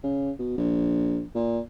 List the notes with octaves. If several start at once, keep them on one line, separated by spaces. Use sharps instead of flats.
C#3
B2
A#1
A#2